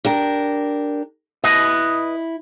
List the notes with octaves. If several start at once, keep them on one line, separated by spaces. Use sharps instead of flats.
D4 G4 A#4
E4 B4 D#5